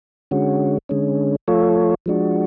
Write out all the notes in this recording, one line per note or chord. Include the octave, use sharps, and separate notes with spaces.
D3 G#3 C#4 F#4
D3 G#3 C#4
F3 A3 F4 A4 C#5
F3 G#3 D4 F#4